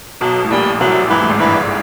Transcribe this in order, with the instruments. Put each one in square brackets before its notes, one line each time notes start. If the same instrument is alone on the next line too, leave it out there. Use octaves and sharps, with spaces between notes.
[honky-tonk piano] B1 B2 [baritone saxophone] F#3
[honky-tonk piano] A2
[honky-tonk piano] A#1 A#2 [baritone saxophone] G3
[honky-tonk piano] C2 C3 [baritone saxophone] F#3
[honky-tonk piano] G#2 [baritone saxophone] E3
[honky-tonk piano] A2
G#1 G#2
[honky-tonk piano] G1 G2 [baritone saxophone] E3